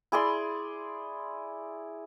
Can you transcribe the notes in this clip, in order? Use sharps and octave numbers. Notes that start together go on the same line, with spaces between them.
E4 G#4 D5 C6